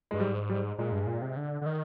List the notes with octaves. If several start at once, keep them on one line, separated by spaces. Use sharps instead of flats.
G2 G#3
G#2 G3
G3
A#2 G#3
G2
G#2
A#2
C3
D3
D3
D#3